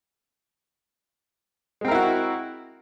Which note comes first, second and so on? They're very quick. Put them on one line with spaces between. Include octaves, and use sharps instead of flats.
G#3 C4 A#4 E4 F#4